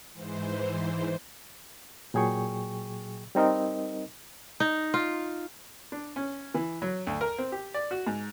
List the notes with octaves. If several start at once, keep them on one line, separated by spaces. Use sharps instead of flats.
G#2 E3 C5
A#2 F#3 G#4 G5 C#6
G3 C4 D#4 A#4 D#5
D#4
F4
D4
C#4
E3
F#3
D2
A#4
C4
G4
D5
F#4
G#2